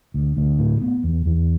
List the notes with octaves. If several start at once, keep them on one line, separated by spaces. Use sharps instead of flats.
D2
D2
A2
B3
E2
E2